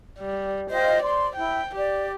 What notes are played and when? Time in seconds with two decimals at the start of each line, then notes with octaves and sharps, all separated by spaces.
0.19 G3
0.71 F4 C5 D#5 G5
1.03 D5 C6
1.36 E4 G5
1.76 G4 D5